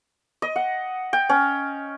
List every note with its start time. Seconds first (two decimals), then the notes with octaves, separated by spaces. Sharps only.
0.42 D#5
0.56 F#5
1.13 G5
1.29 C#4